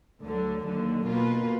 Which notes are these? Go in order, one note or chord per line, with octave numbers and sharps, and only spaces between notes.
D2 D3 F#3
D#2 D3 F#3
B2 A#3 F4 B4